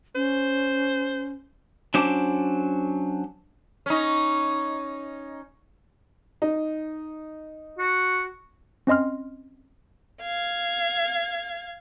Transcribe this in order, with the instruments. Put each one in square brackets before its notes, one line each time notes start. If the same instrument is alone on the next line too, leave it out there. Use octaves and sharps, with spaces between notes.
[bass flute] C#4 [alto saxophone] C5
[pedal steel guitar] F#3 C#4 D4 C5 D6
[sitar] C#4 D#4
[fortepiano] D#4
[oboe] F#4
[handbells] C4 C#4 D#5 C6 F6
[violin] F5 G#6